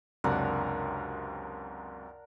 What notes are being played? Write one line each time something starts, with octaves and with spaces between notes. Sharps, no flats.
C#2 F#2 C3 D4 A#4 F#5